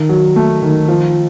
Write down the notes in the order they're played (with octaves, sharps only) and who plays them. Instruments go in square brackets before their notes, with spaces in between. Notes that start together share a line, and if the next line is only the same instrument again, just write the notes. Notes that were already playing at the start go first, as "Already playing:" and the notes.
Already playing: [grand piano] D#3
F#3
A3
D#3
F3